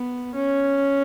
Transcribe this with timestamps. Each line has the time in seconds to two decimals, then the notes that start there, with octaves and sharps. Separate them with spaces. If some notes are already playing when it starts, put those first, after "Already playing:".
Already playing: B3
0.35 C#4